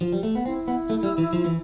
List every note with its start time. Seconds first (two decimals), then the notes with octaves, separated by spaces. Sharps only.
0.01 F3
0.13 G3
0.23 A3
0.35 B3
0.46 C4 E4
0.68 B3
0.90 A3
1.03 G3
1.18 E3
1.33 F3
1.45 E3